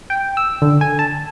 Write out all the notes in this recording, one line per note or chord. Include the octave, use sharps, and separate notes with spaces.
G5
E6
D3
G#5
A5